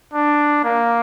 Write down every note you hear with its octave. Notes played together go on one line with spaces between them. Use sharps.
D4
A#3